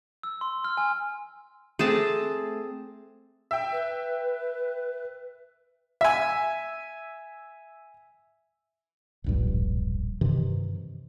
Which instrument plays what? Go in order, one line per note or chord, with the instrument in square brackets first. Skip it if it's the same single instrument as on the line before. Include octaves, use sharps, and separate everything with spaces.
[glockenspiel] E6
C6
F6
G#5
[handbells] A3 C4 A4 [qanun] G#4 C5 A5
[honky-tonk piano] E5 G5
[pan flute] B4
[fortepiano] E5 G#5
[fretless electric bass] D1 A#1 G2
G2 C3 D#3 E3